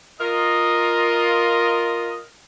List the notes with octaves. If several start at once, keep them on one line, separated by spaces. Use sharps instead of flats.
F4 A#4 D#5